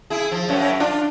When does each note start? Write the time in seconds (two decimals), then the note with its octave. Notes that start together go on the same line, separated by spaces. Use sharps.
0.10 E4 G#4
0.32 F3
0.49 F#2 C#4
0.80 D4 F4